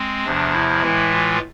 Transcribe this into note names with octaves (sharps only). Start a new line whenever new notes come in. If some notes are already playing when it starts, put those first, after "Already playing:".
Already playing: G#3 C4
E2 C3 F3 D4
E4
A2 E3 G#3
F4